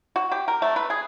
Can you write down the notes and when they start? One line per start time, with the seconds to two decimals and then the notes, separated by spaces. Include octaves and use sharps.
0.16 F#4
0.32 G4
0.48 A#4
0.62 A3
0.76 B4
0.90 G#4